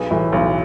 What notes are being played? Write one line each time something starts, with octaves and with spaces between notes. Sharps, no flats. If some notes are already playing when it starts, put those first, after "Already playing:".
Already playing: B1 G#4 B4
A2 E3
B1